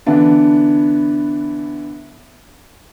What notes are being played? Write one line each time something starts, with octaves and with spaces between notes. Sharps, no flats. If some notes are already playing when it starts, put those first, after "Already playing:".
D3 E3 B3 D4